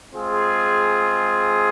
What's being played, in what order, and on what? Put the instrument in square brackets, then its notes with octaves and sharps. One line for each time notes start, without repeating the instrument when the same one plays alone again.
[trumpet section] G#3 C4 F4 G#4